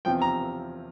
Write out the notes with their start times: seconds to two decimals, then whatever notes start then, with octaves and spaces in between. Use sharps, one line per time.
0.05 E2 C3 F3 G5
0.22 A#5